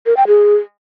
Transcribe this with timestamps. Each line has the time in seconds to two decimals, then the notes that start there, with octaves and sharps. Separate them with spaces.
0.06 A#4
0.17 G5
0.27 G#4